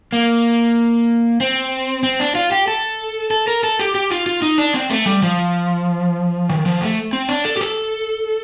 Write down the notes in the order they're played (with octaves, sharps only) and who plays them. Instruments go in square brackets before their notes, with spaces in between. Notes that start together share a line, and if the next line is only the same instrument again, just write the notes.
[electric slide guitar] A#3
C4
C4
D4
F4
G4
A4
A4
A#4
A4
G4
G4
F4
F4
D#4
D4
C4
A3
G3
F3
D#3
F3
A3
C4
D4
A4
G4
A4